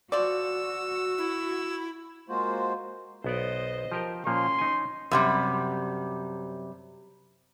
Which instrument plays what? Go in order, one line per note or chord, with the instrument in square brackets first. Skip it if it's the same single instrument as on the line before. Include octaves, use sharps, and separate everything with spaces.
[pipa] F3 D5 [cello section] F#4 [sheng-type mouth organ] E6
[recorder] E4
[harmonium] G#3 A#3 F4 F#4 C5
[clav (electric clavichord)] B1 B3 D5 [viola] C5 D#5
[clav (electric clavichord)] F3 G4 A#4
[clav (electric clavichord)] A#2 F3 A#3 [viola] C#4 [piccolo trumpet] C6
[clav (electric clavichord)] D#4 G#5
[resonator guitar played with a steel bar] F#2 C3 G3